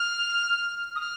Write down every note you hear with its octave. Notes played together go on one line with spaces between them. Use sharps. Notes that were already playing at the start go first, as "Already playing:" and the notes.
Already playing: F6
D#6
F6